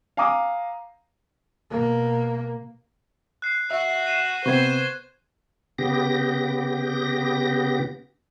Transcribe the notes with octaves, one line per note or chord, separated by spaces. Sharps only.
F5 G#5 A#5 D6 D#6
B2 A#3
F#6 C7
F#4 E5
C7 D#7 E7
C3 B3 C4 C5 C#6 G#6 C7
C#3 B3 G4 A#6